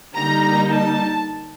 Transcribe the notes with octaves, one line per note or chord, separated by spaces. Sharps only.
D3 G3 A#3 D#4 A#5
A5